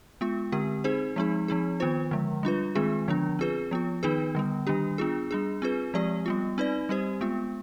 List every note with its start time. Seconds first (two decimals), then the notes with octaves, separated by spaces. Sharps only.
0.21 G#3 B3 F4
0.52 D3 G#3 C4 G4
0.84 C4 D#4 G#4 C5
1.16 F3 G#3 C4 D#4 G#4
1.48 F3 C4 D#4 G#4
1.80 D#3 B3 F4 C5
2.11 D3 F3 G#3
2.43 G3 D4 F4 B4
2.75 D#3 G#3 C4 F4 G#4
3.08 D3 F3 B3 D4
3.39 C4 F4 G#4 B4
3.71 F3 B3 F4
4.03 D#3 B3 D#4 G#4 B4
4.35 D3 G3 B3
4.67 D#3 G3 D4 G4
4.98 B3 D4 F4 G#4
5.31 G3 D4 G#4
5.62 C4 F4 G#4 B4
5.94 F3 G#3 C4 G4 D5
6.26 G3 B3 F4
6.58 C4 D#4 B4 D5
6.89 G3 C4 G4 C5
7.21 G#3 B3 F4